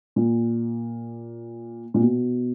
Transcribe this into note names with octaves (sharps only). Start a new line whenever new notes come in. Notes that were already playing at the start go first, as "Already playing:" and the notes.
A#2
A#2
B2